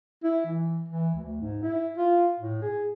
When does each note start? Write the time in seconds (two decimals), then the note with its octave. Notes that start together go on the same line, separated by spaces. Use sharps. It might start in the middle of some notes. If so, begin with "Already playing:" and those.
0.24 E4
0.45 E3
0.88 E3
1.14 D2
1.42 G#2
1.63 E4
1.97 F4
2.40 A2
2.62 G#4